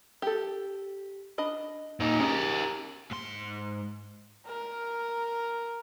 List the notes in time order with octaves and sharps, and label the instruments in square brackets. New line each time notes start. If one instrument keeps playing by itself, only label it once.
[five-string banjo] G4 A4
D4 D#5 B5
[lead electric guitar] A#2 D#4
[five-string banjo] C#4 G#4 [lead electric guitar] G4 A#4
[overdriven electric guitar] G#2 C6
[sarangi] A#4